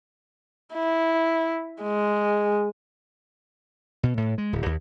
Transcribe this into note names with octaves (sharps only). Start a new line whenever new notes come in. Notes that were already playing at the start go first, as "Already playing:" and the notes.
E4
G#3
B2
A2
G#3
D1
D#2